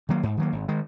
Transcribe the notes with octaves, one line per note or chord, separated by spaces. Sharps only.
D#3 F#3 A#3
G#2
D#3 F#3 A#3
G#1
D#3 G#3